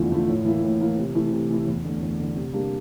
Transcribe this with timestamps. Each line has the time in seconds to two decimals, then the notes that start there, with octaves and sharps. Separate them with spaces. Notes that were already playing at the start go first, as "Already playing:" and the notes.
Already playing: E2 D3 F3 A3 E4
0.10 D3 F3 A3 E4
0.27 A2
0.45 E3 A#3 E4
0.63 A2
0.80 E3 A#3 E4
0.97 C3
1.15 E3 A3 E4
1.32 C3
1.49 E3 A3 E4
1.67 E2
1.84 D3 A3
2.02 E2
2.19 D3 A3
2.36 C3
2.53 G3 A#3 D4